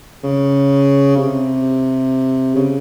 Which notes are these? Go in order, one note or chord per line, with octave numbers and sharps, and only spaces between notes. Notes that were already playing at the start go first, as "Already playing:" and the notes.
C#3
C3
C#3